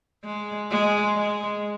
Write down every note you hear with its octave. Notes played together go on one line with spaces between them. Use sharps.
G#3
G#3
G#3